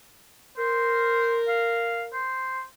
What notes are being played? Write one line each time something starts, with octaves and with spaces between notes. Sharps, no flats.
A#4 C5
F5
C5